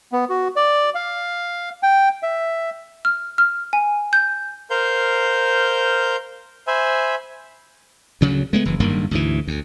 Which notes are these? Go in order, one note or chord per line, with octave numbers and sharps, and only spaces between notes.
B3
F#4
D5
F5
G5
E5
F6
F6
G#5
G6
A#4 C5 F5 G6
C5 E5 G#5 B5
D2 C#3 F#3
G#3 A3 B3
F#1 E3
F#1 G2 D#3 A#3
D2 G#2 E3
D2